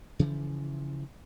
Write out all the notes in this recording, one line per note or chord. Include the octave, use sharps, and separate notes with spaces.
C#3 E3 F3